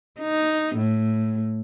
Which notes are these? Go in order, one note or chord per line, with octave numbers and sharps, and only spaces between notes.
D#4
A2